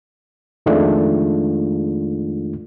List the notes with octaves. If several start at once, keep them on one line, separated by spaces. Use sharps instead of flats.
F2 D#3 G#3 A3 D4 F4